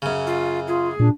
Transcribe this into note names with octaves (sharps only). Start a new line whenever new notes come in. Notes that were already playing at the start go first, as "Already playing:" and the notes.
F#2 C#3
F4
F4 G#4
A#2 D4